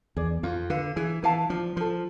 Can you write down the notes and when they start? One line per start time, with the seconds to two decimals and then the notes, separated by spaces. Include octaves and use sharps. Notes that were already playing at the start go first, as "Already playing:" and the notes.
0.16 E2 G#4 D5
0.43 F2 F4
0.70 D3 B4 F5
0.96 E3 G#4
1.23 E3 B4 F5 A5
1.49 F3 D4
1.76 F3 A4 C5